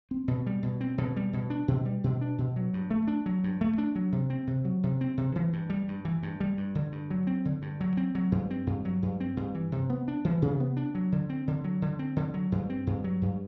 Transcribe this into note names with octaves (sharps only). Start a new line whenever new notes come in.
C4
B2
G3
B2
C4
B2
G3
B2
D4
B2
G3
B2
D4
B2
F#3
G2
A3
D4
F#3
G2
A3
D4
F#3
C3
C4
C3
F#3
C3
C4
C3
E3
G2
G3
G2
E3
G2
G3
G2
D3
G2
F#3
C4
D3
G2
F#3
C4
F#3
G2
C4
G2
F#3
G2
C4
G2
E3
C3
B3
D4
E3
C3
B3
D4
F#3
D3
C4
D3
F#3
D3
C4
D3
F#3
G2
C4
G2
F#3
G2